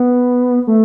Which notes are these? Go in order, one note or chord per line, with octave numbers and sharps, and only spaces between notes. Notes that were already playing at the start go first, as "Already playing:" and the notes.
Already playing: B3
A3